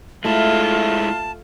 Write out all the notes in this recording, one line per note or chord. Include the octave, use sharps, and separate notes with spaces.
G#3 A3 E4 F4 A5